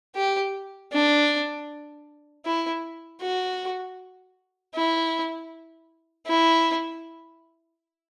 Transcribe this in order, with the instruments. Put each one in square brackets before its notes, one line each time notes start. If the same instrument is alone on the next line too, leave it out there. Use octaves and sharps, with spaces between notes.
[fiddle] G4
D4
E4
F#4
E4
E4